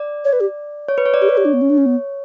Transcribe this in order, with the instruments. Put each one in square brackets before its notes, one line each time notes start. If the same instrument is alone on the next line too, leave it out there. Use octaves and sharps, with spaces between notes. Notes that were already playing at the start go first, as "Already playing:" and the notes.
Already playing: [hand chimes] D5
[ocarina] C#5
B4
G4
[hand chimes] C#5
B4
C#5
D5
[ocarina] G4 [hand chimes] C#5
[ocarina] B4
G4
D4
B3
C#4
D4
C#4
B3